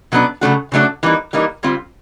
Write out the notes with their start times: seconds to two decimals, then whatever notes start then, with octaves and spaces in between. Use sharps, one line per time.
0.12 B2 F#3 B3 D4
0.41 C#3 F#3 A3 D4 F#4
0.72 C#3 F#3 A3 D4 F#4
1.03 E3 G3 A#3 D#4
1.33 E3 G3 A#3 D#4
1.63 D3 G3 C4 F4